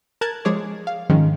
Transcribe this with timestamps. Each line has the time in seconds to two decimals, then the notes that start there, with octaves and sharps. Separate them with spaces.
0.21 A#4 A5 F#6 G#6
0.45 F3 G#3 G#4 C#5 D5
0.87 F5
1.09 G#2 D#3 F3 G#3 C#4